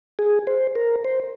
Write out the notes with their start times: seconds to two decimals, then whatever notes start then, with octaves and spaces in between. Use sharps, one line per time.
0.19 G#4
0.47 C5
0.75 A#4
1.05 C5